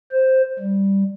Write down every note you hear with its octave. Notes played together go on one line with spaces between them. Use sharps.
C5
G3